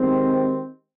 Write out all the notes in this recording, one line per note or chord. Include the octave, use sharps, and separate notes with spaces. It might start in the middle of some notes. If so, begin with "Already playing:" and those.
Already playing: D#3 G#3 C4 D#4 G4